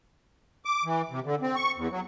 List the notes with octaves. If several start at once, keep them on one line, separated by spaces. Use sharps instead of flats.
D6
E3
C3
D3
C4
C#6
E2
F#3